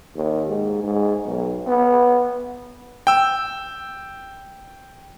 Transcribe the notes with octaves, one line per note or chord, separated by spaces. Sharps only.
D#2
G#2
G#2
B1
B3
G5 E6